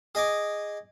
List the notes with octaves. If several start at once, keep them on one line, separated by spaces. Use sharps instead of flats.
G#4 D#5 G#5 D6